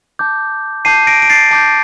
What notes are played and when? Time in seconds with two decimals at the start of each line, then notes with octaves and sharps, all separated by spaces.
0.19 A5 D6 G6
0.85 A5 D6 G6 C7 D#7
1.07 A#6 D7
1.22 D7
1.30 A6 C7
1.51 A5 D6 G6